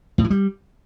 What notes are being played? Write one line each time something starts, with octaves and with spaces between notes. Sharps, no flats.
A2
E3
G3